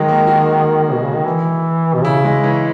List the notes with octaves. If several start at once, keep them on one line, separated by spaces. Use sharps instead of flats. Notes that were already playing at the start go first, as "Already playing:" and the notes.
Already playing: D#3 F#3 G#3
A#3
F#4
B2
C#3
D#3
E3
B2
C#3 E4
G#3
E3